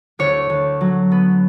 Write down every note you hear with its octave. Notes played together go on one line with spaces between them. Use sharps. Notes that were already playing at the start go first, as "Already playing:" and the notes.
D2 C#5
D2
F#3
B3